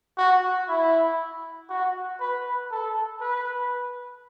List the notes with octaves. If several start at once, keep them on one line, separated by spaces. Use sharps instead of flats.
F#4
E4
F#4
B4
A4
B4